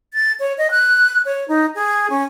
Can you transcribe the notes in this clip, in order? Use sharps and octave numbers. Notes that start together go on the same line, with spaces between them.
A6
C#5
D#5
F#6
C#5
D#4
G#4
C#4